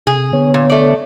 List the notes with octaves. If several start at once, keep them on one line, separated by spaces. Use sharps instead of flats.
C3 G#4
D3 B3 C#5
A#2
A3 D5